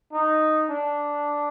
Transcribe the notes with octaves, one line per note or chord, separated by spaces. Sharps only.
D#4
D4